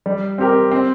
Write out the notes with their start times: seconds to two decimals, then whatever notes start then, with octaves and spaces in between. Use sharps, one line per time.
0.06 G3
0.38 C4 G4 A#4
0.71 C4